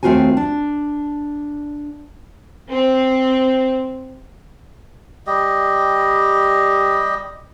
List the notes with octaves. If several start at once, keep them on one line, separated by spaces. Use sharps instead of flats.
D#2 A3 C4 F4 F#4 G#5
D4
C4
G3 G4 D#5